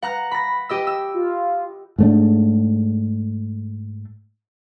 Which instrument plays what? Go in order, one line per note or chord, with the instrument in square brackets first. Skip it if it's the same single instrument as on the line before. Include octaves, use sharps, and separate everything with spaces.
[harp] F#5 A#5 F#6
B5 A#6
G4 D#5 E6
E6
[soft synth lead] F4
[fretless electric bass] G#2 A3 D4